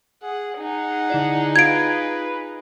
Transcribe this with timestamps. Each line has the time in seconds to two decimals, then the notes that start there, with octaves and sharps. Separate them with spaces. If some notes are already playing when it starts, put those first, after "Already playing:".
0.23 G#4 F#5
0.59 D#4 G#4 F#5
1.10 D3 E4 D5
1.56 F4 B4 F5 G#6 D7